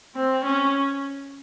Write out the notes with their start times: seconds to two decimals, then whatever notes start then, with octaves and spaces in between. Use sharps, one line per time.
0.16 C4
0.45 C#4